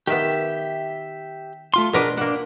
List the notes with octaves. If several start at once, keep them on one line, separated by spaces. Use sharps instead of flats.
D#3 B3 G4 E5
A3 F4 C6
B2 D4 G#4 A#4 B4 D5
A#3 D4 F#5